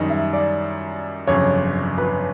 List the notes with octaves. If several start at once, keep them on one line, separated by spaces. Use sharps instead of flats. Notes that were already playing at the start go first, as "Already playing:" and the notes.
Already playing: F#2 D#3 G3 D#5
E5
D5
G1 F2 C#3 F#3 C#5
B4